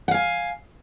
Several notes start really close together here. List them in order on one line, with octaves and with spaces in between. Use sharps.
F#5 F5 G#5